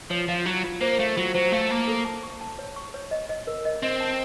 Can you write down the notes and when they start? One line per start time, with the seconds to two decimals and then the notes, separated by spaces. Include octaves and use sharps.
0.10 F3 C#5
0.28 F3 F5
0.46 F#3 F4
0.64 F4
0.81 A#3 C5
0.99 A3 F5
1.17 F#3 F4
1.34 F#3 C5
1.52 A3 F5
1.69 A#3 A5
1.88 A4
2.05 A5
2.23 C#6
2.41 A5
2.59 C#5
2.76 C#6
2.94 C#5
3.11 D#5
3.29 D#5
3.47 A#4
3.65 D#5
3.83 C4 D#5
4.01 A5